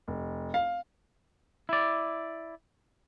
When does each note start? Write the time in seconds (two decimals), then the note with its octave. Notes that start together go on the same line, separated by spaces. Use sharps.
0.08 F1
0.54 F5
1.69 E4 D5